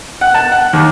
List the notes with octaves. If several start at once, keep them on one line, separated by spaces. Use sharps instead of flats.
F#5
A5
F#5
D#2